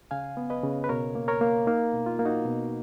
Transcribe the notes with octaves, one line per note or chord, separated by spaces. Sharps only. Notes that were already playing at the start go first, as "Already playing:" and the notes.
C#3 F5 G#5
B3
B4 D#5
C#3
B4
B2 A#4 C#5
A#3
A#4 C#5
A#3
A#3 D#4
B2
F4
A#3
D#4 F#4
B2